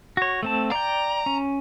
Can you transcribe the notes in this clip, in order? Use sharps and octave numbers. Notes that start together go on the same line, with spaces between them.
F#4 C#5
A3 C4 A5
D5 G5 A#5
C#4